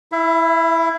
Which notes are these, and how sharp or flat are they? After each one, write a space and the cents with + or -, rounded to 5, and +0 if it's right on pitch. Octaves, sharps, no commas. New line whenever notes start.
E4 +0 E5 +35